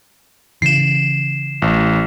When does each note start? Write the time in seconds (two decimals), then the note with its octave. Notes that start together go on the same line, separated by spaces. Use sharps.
0.62 C#3 E3 C7 E7
1.62 A1